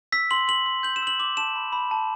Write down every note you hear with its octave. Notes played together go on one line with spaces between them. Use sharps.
E6 B6
C6 F#7
C6 F#7
C6
G6 F#7
E7
E6 F#7
D6 F#7
A5 E7
B5
B5
A5